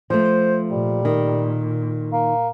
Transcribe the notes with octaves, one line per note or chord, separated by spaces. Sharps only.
F3 A3 C5
A#2 G3
D#3
A#3